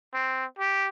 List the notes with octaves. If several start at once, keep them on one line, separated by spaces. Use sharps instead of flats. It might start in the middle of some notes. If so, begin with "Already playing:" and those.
C4
G4